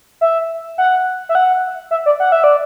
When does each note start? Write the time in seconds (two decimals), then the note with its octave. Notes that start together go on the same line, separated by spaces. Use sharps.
0.21 E5
0.78 F#5
1.29 E5
1.35 F#5
1.91 E5
2.06 D5
2.20 F#5
2.32 E5
2.44 D5